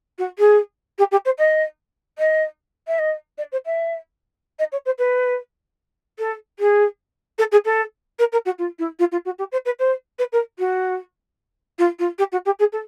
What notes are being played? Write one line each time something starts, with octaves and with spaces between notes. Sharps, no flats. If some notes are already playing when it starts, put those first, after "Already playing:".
F#4
G#4
G4
G4
C5
D#5
D#5
E5
D#5
D5
C5
E5
D#5
C#5
C5
B4
A4
G#4
A4
G#4
A4
A#4
A#4
F#4
F4
E4
F4
F4
F#4
G4
C5
B4
C5
B4
A#4
F#4
F4
F4
G4
F#4
G4
G#4
A4